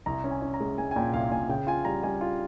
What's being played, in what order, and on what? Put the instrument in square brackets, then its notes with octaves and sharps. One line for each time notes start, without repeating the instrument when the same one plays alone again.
[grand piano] C2 A#5
C#4
G#5
C#4
A#5
G#3
G#3 G#5
G#5
A#2 G5
C2 F5
A#2 G#5
C#3 G5
F4 G#5
G3 A#5
G3 G#5
F4